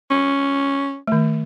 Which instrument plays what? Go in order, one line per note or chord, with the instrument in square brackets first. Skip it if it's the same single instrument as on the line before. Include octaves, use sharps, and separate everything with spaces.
[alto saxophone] C#4
[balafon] D#3 A3